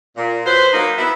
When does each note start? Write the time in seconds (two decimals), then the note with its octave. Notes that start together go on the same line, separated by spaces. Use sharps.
0.17 A#2
0.46 F#3 B4 C5
0.72 F#3 A#3 D#4
0.98 B3 E4